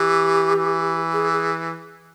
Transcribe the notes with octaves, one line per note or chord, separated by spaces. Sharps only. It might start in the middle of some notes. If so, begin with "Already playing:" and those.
Already playing: E3 G4
E3
G#4
G#4